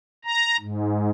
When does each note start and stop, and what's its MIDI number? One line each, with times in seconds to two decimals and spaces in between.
0.25 0.57 82
0.60 1.10 44